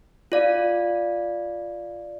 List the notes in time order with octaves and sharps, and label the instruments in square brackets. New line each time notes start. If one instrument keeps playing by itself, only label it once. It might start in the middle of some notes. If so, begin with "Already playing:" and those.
[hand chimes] F4 D5 F5